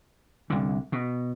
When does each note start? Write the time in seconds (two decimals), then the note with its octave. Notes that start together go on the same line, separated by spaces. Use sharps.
0.50 C2 D3
0.92 B2